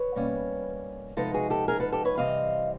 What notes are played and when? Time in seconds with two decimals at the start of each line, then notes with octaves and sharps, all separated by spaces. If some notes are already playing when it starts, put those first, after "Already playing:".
Already playing: B4 C#5
0.15 B2 G3 A#3 C#4
1.17 C3 F3 G#3 B3 D#4 A4 B4
1.34 F#4 G#4
1.50 G4 A4
1.68 G#4 A#4
1.80 A4 B4
1.92 G4 A4
2.05 B4 C#5
2.18 C3 E3 G3 C4 D#5 F5